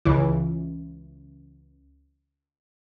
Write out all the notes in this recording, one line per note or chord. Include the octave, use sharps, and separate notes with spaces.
C#2 E3